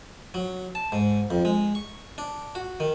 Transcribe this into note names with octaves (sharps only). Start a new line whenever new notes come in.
F#3
A5
G#2
F2
G#3
C#6
D4
F#4
D#3